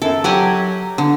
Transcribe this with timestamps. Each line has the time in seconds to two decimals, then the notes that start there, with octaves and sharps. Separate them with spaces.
0.02 F#2 A4
0.24 F#3 G4 F#5 G#5
0.98 D3